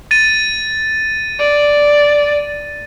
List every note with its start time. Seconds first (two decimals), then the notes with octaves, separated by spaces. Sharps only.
0.11 A6 D#7
1.39 D5